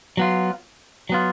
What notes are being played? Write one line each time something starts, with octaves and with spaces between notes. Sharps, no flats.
F#3 B3 F4
F#3 B3 F4